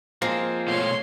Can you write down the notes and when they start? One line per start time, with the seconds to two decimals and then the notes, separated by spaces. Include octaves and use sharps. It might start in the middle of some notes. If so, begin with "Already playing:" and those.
0.22 F3 G#3 A#3 C4
0.68 B2 A3 F4 C#5 C6